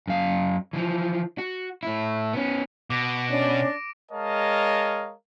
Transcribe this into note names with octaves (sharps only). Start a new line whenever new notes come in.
F#2 F5
E3 F3
F#4
A2 E4
B3 C#4
B2 D6 A#6 D7
C#4 D4
G#3 A#4 C#5 D#5 F5 A5